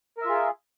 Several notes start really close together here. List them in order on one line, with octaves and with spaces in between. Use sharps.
A#4 E5 F4 G#4